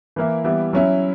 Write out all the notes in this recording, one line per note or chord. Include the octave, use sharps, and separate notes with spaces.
E3 A#3 E4
E3 G3 B3 E4
F#3 C#4 E4